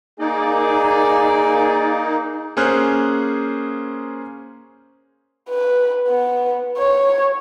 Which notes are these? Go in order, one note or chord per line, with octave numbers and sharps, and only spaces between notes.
A#3 D#4 G#4 D5
A#3 C#4 G#4 C5 F6 F#6
B4
B3
C#5